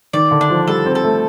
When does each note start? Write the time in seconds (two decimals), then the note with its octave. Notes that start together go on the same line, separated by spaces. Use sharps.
0.13 D#3 D5
0.31 D3
0.41 D4
0.50 F3
0.68 G3 A4
0.85 C4
0.95 A4
1.04 A3